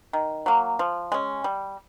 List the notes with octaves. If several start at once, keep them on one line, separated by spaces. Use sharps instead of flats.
D#3
F#3 A#3
F3
G#3 C#4
G3